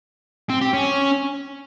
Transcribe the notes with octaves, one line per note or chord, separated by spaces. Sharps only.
C4
G4
C#4